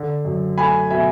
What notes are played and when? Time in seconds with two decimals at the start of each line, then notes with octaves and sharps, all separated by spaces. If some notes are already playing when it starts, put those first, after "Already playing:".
Already playing: D3
0.25 F#2
0.58 A3 G#5 B5
0.91 B2 E5 G#5